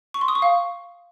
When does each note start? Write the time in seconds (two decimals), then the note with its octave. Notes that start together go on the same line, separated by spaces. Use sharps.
0.14 C#6
0.21 C6
0.28 D#6
0.35 C#6
0.42 F5